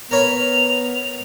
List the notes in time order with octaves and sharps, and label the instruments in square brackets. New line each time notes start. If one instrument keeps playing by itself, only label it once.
[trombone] B3 [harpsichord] A#4 C#5 B5 [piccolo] F7